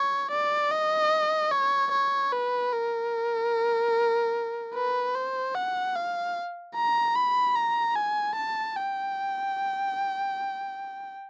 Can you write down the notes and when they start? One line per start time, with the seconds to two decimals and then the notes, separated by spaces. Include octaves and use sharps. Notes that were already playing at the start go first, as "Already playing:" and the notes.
Already playing: C#5
0.31 D5
0.71 D#5
1.51 C#5
1.92 C#5
2.32 B4
2.73 A#4
4.74 B4
5.15 C5
5.55 F#5
5.95 F5
6.76 A#5
7.16 B5
7.56 A#5
7.96 G#5
8.36 A5
8.76 G5